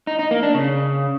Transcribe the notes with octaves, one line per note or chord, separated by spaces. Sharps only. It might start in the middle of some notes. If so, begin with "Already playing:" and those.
D#4
D#4
A#3
D4
C#3